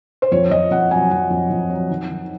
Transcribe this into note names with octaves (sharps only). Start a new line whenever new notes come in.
C5
F2 C#5
F2 D#5
F2 F#5
F#3 G#5
F2 F#5
F2
F2
F#3
D#3
D#3